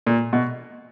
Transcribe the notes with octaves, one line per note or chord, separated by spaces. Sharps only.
A#2
B2